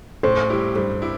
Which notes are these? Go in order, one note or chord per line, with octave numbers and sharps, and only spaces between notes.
A2 C5
G3 E4 G4
G2 C5
G3 C4 E4 G4